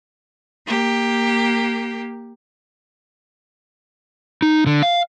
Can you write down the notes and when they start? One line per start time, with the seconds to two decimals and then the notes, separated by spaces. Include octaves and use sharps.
0.66 A#3 G4
4.42 D#4
4.66 D3
4.83 F5